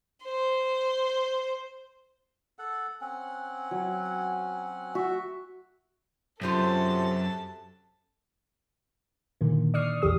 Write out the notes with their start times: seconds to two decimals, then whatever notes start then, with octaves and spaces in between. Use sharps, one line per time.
0.25 C5
2.59 A4 F#5
3.01 C4 C#4 F#5
3.71 F#3
4.95 F#4 E5
6.42 F#2 C3 F4 A4 C5 C#5 A5
9.41 A#2 D3 D#3 A#3
9.74 D5 C#6 D#6 F6 C7
10.02 A#1 E2 E3 G4 D#6